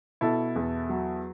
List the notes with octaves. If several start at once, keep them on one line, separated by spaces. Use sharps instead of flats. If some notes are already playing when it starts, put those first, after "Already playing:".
B2 E4 A4
E2
F#3